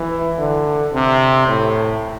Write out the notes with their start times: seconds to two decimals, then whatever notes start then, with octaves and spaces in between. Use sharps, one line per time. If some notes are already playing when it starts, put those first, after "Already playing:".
Already playing: E3
0.38 D3
0.93 C3
1.47 A2